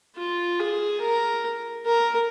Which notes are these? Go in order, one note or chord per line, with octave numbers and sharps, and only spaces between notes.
F4
G#4
A#4
A#4